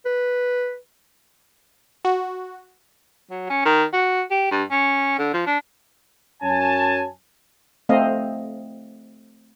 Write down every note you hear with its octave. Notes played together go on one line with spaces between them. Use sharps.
B4
F#4
F#3
C#4
D#3
F#4
G4
G2
C#4
D3
F3
D4
F#2 C#4 G#5 A5
A3 C4 D#5 F5